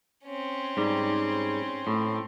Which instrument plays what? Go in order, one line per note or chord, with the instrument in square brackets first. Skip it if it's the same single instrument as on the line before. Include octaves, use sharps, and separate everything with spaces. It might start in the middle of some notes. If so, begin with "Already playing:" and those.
[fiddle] C4 C#4
[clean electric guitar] G#2 G3
A2